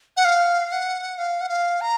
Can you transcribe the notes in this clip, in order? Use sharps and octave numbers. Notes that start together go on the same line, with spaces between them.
F#5
F5
F#5
F5
F#5
F5
A#5